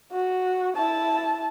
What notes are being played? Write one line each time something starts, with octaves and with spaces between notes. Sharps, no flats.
F#4
E4 A5